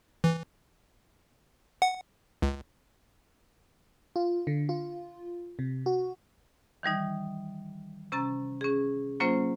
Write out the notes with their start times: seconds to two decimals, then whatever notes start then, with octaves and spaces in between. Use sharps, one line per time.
0.24 E3
1.82 F#5
2.42 C#2
4.16 F4
4.47 D3
4.69 F4
5.59 C3
5.86 F#4
6.83 D#3 E3 G3 D#4
8.12 C3 C#4 A#5 A6
8.61 C#4 G#4
9.20 F#3 A#3 C#4 F4 C5